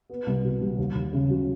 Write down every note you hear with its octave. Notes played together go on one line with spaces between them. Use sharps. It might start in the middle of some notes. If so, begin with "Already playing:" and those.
B3
C2
B2
G3
D#2
D#2
C#3
F#3